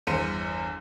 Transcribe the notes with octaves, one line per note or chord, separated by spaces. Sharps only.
G1 E2 C5 C#7 D#7